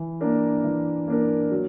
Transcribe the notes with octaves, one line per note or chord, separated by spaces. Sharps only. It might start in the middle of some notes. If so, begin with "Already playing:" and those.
Already playing: E3
A#3 D4 A#4
E3
A#3 D4 A#4
F#3